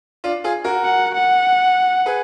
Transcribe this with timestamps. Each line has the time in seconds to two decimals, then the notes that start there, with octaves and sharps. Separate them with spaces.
0.24 D4 F4
0.44 F4 G#4
0.64 F#4 A#4
0.84 F#5
1.15 F#5
2.06 G#4 B4